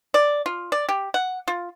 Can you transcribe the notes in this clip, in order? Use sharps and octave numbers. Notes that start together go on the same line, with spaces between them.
D5
F4
D5
G4
F#5
F4